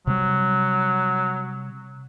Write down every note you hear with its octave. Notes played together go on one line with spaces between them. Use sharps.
C3 F#3 G3